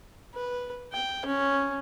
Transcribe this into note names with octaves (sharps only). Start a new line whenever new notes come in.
B4
G5
C#4